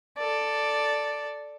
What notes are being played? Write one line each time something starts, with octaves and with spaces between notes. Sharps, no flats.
A4 D5